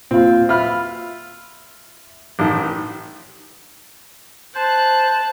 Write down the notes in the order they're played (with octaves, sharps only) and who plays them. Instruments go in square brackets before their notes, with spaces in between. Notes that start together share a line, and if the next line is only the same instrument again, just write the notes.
[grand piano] A#2 F4 [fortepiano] C4
[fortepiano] F4 B5 F6 [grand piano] E5
[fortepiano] A1 A2 D#3
[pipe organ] C5 [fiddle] A5 F#6